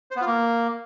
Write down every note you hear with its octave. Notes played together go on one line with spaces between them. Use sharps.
C5
B3
F4
A#3